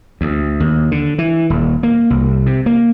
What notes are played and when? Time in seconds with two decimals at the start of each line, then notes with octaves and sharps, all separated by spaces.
0.21 D2
0.60 D#2
0.91 D3
1.18 E3
1.50 D#1
1.83 A#3
2.10 C2
2.46 C3
2.66 A#3